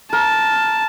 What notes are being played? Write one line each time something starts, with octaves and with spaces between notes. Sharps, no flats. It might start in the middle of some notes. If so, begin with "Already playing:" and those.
A#4 A5